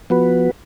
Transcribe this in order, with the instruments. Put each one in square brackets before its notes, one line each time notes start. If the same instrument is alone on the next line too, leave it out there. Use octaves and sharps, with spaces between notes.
[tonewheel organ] F3 B3 F#4 B4